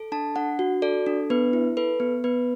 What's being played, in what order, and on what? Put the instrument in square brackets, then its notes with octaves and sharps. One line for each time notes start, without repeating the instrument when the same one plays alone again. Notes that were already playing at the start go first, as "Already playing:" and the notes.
Already playing: [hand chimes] A4
D4 A5
D4 F#5
F#4
A4 D5
D4
B3 B4
E4
A4 B4
B3
B3 B4